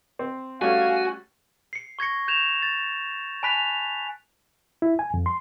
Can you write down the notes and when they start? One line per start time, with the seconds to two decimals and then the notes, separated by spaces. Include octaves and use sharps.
0.19 C4
0.61 G3 A3 C#4 F#4 F5 G#5
1.73 C7 C#7
1.99 C#6 G#6 A#6 C#7
2.28 G6 G#6 E7 F7
2.62 A6
3.43 G#5 A5 B5 F#6 B6 F7
4.82 E4
4.99 G#5
5.14 F2
5.26 C6